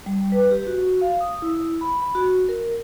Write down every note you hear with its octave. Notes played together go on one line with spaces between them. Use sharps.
G3
B4
G4
F#4
F5
D#6
E4
B5
B5
F#4
A#4